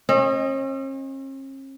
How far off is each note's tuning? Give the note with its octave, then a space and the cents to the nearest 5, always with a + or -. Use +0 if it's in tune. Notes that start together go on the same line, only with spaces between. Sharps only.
C#4 -45 D#5 +0